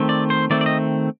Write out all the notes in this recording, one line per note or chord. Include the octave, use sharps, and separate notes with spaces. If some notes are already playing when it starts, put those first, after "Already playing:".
Already playing: D#3 A3 C4
D5
C5
D#3 A3 C4 D5
D5
D#5